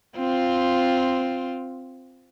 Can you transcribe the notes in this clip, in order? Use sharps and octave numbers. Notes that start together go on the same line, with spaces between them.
C4 F4